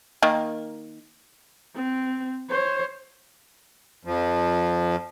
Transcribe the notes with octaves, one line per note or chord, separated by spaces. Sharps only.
D#3 A#3
C4
C5 C#5
F2 F3